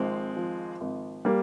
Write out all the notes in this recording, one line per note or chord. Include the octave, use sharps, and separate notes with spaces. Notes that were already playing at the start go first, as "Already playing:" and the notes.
Already playing: G#1 F3 G#3 C4
F3
G#1
G3 A#3